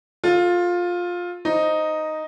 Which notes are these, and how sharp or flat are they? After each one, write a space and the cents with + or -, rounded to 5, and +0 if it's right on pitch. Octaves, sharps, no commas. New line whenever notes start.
F4 +15 A4 +0
D#4 +0 C5 +0